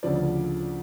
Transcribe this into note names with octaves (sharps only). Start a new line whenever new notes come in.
D2 C#3 F3 D5